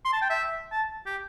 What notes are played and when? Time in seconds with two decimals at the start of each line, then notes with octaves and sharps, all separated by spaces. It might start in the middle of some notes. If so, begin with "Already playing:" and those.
0.05 C6
0.13 A5
0.21 G5
0.30 E5
0.71 A5
1.06 G4